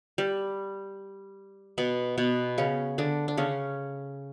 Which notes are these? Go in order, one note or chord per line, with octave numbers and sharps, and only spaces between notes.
G3
B2 B3
B2 B3
C#3 C#4
D3 D4
D4
C#3 C#4